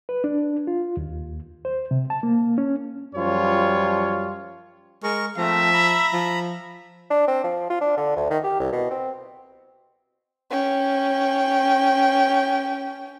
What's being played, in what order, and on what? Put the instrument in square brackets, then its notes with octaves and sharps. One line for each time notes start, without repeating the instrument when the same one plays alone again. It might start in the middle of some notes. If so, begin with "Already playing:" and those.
[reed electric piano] B4
D4
F4
D#2
C5
C3
A5
A#3
C#4
[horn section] F#2 F3 G3 F4 C#5
[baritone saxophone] G#3 [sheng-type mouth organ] A#4 C#6
[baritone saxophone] F3 [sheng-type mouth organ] A3 C4 A#5 [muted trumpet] E5
[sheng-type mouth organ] A#5 B5
[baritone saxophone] F3
[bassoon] D4
C4
F3
F4
D4
D3
D2
D#3
G4
C2
B2
C4
[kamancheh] C#4 G5